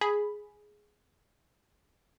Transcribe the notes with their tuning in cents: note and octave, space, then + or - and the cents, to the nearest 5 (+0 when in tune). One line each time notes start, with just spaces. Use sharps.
G#4 +5 B5 +0